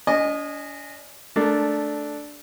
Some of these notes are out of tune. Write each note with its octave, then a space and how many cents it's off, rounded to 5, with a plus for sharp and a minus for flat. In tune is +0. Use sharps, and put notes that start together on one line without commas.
D4 -45 D#5 -15 G#5 -5
A3 -10 D4 +0 A#4 -25